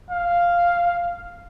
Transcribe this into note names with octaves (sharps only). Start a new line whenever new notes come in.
F5